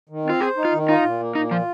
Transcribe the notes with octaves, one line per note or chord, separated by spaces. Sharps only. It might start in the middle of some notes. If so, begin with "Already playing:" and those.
D#3
C4 F4
G#4 C5
D#4
F4
D#3
D#4 F4
A#2
A#3
A#2 D#4
F3 F4